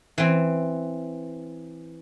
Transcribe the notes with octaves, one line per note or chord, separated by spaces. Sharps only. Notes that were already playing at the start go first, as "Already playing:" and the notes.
E3 C4